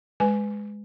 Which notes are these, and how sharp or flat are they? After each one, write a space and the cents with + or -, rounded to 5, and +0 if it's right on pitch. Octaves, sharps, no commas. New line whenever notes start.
G#3 +0 B4 +15 G#5 +10